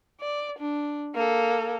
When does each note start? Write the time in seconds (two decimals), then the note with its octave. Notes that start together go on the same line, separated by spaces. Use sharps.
0.21 D5
0.59 D4
1.15 A#3 A4